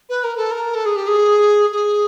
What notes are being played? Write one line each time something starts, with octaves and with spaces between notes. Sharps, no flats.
B4
A#4
A4
A#4
A4
G#4
G4
G#4
G#4